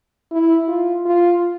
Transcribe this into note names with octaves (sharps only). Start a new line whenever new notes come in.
E4
F4
F4